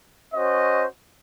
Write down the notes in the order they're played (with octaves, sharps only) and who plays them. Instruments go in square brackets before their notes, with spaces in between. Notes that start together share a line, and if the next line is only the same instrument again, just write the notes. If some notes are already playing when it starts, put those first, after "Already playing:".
[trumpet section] C#4 F#4 C5 D#5